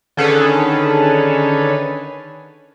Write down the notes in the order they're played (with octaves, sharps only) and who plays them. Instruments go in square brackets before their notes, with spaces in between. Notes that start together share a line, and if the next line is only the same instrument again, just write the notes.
[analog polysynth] D3 D#3 C#4 G#4 A4 B4